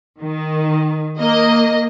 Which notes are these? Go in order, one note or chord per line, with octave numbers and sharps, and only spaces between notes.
D#3
A#3 D#5